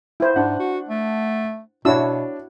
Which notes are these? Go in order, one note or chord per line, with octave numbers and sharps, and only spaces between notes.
E4 C5
G#2 D4 F#5
F#4
A3
B2 D4 E4 F#4 C#5 E6